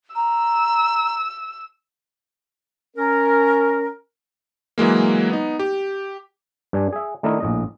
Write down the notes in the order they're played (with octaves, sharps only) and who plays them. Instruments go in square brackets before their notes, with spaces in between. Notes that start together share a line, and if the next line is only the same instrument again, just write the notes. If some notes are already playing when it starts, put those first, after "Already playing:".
[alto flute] A#5 [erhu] E6
[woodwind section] C#4 A#4
[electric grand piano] E3 F#3 G#3 A#3
B3 D#4
G4
[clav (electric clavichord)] G2 D4 G#5
G#4 E5
D#3 A3 D4 E4 A#4 D#5
A#1 A2 D#5